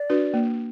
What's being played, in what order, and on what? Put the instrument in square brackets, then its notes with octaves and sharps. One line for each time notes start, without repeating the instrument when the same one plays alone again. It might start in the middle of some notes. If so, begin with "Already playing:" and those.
Already playing: [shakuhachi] D5
[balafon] D4 F#4 B4
A#3